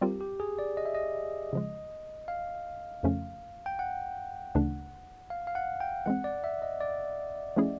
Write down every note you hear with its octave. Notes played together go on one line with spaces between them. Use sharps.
G3 C4 F4 G4 A#4
G4
G#4
D5
D#5
E5
D#5
C#3 F3 G#3
F5
F2 C#3 F3 A3 C#4
G5
F#5
D2 C#3 E3 A3 D4
F5
F5
F#5
G5
E3 G#3 C4 F#5
D5
E5
D#5
D5
F3 A3 C#4 E4 G#4